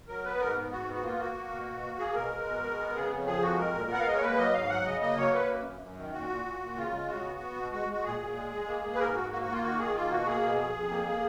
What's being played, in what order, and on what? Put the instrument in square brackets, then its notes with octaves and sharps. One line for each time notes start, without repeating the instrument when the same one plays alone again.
[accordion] F#3 A#4
B3 B4
G#2 A#4
B3
G#2 F#4
B3
F#4
A#3 F4
A#3 F#4
A#3
B2
B2
A#3
A#3 G#4
B2 A#4
G#3
B2
G#3
B3
C#3 G#4
F2
F3 G#4
F2 F#4
G#3 A#4
A#2
B3 F#5
F5
G#3 D#5
C#5
A#3 B4
F#3 D#5
G#2 F5
F#3 F#5
C#3 D#5
A#3 D#5
F#3 C#5
A#3 B4
F#2
F#2
F#2
D#3
A#2 F#4
A#2
A#2
A#2
C#3 F4
G#3
C#3 F#4
B3
B3
B2
G#3 F#4
G#3 F#4
A#2 G#4
A#2
G#3
G#3
A#3
A#3
B4
G#2 A#4
G#2 F#4
A#3 F#4
F#4
A#3
F4
D#3 F#4
D#3 G#4
A#3 F4
B2 F#4
A#3 G#4
B2
F2
F2
A#3
A#3